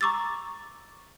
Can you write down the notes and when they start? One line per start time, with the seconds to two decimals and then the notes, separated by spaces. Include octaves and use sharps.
0.01 A#5 C#6 D6 E6 A6